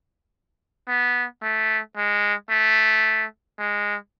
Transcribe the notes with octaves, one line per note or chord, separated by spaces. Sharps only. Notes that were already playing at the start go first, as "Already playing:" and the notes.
B3
A3
G#3
A3
G#3